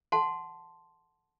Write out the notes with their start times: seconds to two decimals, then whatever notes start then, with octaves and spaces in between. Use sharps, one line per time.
0.12 F#5 A5 C6